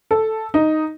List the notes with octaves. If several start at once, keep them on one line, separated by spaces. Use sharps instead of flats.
A4
D#4